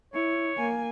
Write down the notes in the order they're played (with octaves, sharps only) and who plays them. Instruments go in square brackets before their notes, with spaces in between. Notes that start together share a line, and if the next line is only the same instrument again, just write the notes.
[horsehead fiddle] E4 [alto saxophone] C#5
[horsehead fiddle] A#3 G#5